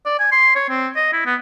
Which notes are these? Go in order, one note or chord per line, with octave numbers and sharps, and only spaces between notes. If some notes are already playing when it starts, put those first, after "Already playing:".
D5
G#5
C6
C#5
C4
D#5
E4
B3